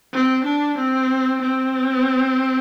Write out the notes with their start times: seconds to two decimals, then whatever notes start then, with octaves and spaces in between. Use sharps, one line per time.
0.13 C4
0.45 D4
0.78 C4
1.42 C4